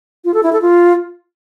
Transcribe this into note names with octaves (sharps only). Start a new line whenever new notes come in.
F4
A4
E4
A4
F4